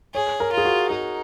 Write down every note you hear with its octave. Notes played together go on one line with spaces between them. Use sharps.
G#4 C#5
A#4
F4
G#4
F#4
D#4 G#4